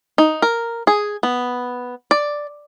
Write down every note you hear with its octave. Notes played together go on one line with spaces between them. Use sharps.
D#4
A#4
G#4
B3
D5